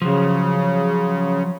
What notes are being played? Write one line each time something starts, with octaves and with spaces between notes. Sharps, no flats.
C#3 F3 F#3